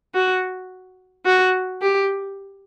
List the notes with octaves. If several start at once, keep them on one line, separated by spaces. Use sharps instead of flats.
F#4
F#4
G4